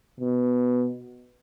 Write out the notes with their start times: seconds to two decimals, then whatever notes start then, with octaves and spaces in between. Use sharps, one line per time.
0.20 B2